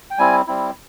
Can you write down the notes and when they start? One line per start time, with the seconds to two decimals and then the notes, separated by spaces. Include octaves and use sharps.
0.11 G5
0.18 G3 C4 E4 G#5
0.47 G3 C4 E4